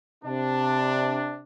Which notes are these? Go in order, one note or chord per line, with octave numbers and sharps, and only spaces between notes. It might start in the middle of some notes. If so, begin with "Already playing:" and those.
C3 D4